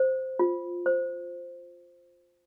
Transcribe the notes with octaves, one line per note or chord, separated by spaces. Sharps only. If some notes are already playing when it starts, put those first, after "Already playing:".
Already playing: C5
F4
C5